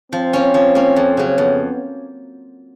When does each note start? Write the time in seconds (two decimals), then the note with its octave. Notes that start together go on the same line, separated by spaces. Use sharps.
0.12 F3 C4
0.33 A#3 C#4
0.54 F3
0.75 A#3 C#4
0.96 F2
1.17 C#3 F#3
1.37 F2 B3